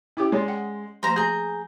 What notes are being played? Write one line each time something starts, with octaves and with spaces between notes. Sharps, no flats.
C#4 E4 G4 D6
G#3 C#5 D5 C6
F#5 G5
F3 A3 A#3 C5 A#5
G#4 A#5 G6